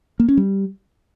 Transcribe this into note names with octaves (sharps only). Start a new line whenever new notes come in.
A#3
C#4
G3